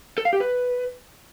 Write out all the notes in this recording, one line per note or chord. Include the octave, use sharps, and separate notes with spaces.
A4
F5
G4
B4